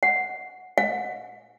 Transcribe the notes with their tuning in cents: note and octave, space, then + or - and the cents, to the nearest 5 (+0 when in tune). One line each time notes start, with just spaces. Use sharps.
F#5 -5
F#5 -35